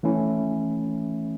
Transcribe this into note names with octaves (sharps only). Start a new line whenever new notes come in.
E3 A3 C#4 E4